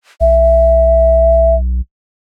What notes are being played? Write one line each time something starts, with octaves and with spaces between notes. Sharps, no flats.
B1 E5